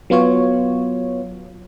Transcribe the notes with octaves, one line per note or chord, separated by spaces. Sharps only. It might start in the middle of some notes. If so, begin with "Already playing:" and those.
F#3 B3 F4 C#5